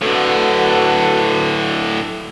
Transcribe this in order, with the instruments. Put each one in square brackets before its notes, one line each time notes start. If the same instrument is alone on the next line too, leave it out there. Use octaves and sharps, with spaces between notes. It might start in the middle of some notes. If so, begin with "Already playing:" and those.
[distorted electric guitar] A2 D3 [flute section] F#4 A4 B4